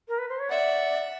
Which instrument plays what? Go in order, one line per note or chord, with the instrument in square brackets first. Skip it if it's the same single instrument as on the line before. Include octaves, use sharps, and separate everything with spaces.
[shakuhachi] A#4
B4
C5
C#5
[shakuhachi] D5 [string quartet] E5 F#5